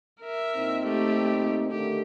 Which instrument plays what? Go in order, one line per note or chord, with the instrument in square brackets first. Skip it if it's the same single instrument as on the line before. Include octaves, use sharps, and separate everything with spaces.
[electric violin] A#4 E5
[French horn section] A#2 C4 D#4
[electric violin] A3 G4
[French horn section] D3 D#3 A3 [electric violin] G4